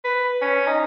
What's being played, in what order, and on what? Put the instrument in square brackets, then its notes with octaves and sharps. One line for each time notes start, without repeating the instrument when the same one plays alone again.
[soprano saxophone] B4
C#4
D#4